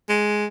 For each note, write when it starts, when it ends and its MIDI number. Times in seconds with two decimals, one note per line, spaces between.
0.09 0.46 56